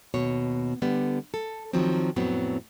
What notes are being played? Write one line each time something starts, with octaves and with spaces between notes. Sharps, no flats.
D#2 B2 C#5
D3 G3 B3
A4
D#3 F3 F#3 C4
F2 A2 F#3 B3 C4